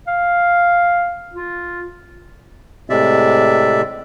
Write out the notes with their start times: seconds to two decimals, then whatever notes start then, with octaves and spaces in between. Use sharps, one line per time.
0.07 F5
1.34 F4
2.90 A2 C3 G#3 D5 E5